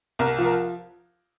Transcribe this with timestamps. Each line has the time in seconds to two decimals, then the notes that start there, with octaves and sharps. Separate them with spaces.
0.19 C2 A#4
0.39 F3
0.44 A#4